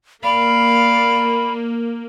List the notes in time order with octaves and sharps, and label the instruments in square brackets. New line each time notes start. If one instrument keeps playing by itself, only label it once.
[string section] A#3 [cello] D5 F5 [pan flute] B5